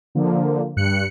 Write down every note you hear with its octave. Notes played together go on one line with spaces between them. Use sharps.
D3 F3 A#3
G2 F#6 C#7